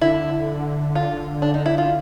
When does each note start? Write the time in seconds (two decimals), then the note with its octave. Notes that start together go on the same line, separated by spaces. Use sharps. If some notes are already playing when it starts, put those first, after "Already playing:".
0.01 D3 E4
0.95 F4
1.42 D4
1.54 D#4
1.66 E4
1.78 F4